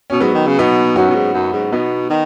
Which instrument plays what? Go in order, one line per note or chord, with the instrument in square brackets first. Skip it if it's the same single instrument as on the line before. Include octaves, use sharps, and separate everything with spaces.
[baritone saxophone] B2 [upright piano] C#4
[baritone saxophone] G#2 [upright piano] F#3 B3
[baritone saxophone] D#3
C#3
[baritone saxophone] B2 [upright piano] B3 D#4
[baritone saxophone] F#2 [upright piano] C#4 F#4
[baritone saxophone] B2
G#2
F#2
G#2
[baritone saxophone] B2 [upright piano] B3 D#4
[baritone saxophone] D#3